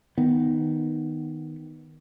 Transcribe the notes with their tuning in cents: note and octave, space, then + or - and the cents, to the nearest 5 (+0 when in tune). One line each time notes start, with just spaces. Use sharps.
D#3 +0 B3 +0